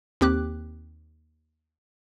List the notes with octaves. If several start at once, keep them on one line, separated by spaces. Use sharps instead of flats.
D#2 C4 G4 D6 F#6